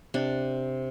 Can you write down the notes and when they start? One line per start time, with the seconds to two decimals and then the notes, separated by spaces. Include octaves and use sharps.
0.14 C3 D4